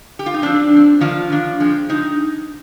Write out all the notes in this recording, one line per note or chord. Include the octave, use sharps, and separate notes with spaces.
G4
F4
D#4
F3 C4 D4
F3 C4
D#3 F3 A#3 D4 F4
D#3 A#3 D4
F3 G#3 C4
F3 G#3 C4 D#4